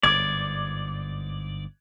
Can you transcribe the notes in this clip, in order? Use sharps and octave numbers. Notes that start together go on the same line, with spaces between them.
G1 G#2 D5 D6 G#6